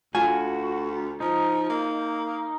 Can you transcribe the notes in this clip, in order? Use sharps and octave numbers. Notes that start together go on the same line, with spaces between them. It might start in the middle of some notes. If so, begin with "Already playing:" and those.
D2 F4 F#4 G#5
F3 D#4
A#3